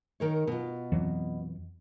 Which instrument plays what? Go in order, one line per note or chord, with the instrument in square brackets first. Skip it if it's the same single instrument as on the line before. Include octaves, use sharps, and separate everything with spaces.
[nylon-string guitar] D#3 A#4 C#5
B2 F4
[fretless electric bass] F2 E3 F#3